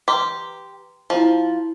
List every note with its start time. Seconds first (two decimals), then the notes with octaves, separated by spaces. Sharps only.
0.08 G4 B4 A#5 C6
1.10 F3 E4 A5